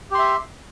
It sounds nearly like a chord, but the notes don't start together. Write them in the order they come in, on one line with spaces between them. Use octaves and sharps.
G4 C6 E5